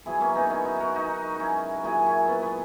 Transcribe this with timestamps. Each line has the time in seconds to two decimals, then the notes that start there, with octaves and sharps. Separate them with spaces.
0.06 B2 F#3 E4 G#4
0.20 A#3 C#4
0.35 B3 D#4
0.50 C#4 E4
0.65 D#4 F#4
0.80 F#4 A#4
0.94 D#4 F#4
1.34 F#4
1.39 C#4 E4
1.76 A#4
1.83 A#2 F#3 E4 G#4
2.06 C#4 E4
2.28 B3
2.42 B3